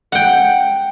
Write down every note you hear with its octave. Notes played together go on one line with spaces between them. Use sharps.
F#5 G5